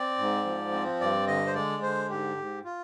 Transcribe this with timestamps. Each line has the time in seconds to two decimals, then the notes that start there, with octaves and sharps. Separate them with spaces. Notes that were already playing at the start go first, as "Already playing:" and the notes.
Already playing: C4 D5
0.18 G#2
0.45 F3
0.72 C4
1.00 G2 D5
1.27 D3 D#5
1.47 C5
1.55 G#3 D5
1.82 D3 C5
2.10 G#2 G4
2.37 G#2
2.65 F4